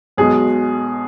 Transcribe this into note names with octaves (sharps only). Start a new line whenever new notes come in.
B1 B2 G#3 G#4